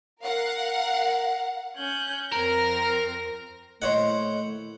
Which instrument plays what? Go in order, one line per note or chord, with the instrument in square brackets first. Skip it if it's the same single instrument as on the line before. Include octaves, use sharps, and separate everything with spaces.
[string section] A#4 F5 F#5
[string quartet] C#4 F#6 G6
[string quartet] F2 C4 A#6 [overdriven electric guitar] A#4
[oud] A#2 E4 D#5 [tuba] A3 [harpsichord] C5 C#5 F#5